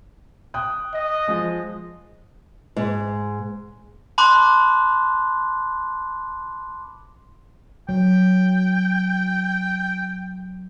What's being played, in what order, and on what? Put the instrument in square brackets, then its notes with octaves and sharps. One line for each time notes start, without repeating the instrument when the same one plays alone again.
[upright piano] G5 D#6 F#6
[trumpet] D#5
[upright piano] F3 G#3
[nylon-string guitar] G#2
[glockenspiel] A5 B5 C6 D6 F#6
[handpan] F#3 [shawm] G5